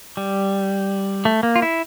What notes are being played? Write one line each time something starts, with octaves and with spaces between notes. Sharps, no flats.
G3
A3
A#3
F4
E4